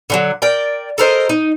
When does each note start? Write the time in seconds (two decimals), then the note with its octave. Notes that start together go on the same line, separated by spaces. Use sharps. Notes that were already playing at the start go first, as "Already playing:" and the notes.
0.10 D3 D#3 F#3
0.42 A#4 D5 G5
0.98 A4 A#4 C5 D#5
1.29 D#4